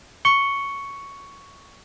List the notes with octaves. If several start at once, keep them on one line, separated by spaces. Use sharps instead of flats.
C#6 C#7 G7